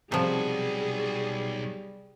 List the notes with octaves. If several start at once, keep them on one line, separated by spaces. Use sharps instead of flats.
B1 C3 F3 G3 F#4 G#4